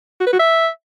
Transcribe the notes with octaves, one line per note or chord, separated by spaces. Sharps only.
F#4
B4
F#4
E5